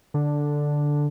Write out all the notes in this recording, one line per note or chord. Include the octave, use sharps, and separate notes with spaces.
D3